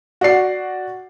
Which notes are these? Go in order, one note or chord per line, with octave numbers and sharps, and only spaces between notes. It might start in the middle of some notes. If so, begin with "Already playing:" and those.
F#4 D5 C7